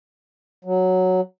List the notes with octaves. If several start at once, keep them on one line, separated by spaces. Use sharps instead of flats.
F#3